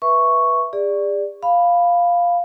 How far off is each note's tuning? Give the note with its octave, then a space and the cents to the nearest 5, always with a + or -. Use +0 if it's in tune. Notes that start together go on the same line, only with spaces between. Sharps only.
B4 -10 E5 +0 C#6 +0
G#4 -40 D5 +0
F5 +0 B5 +0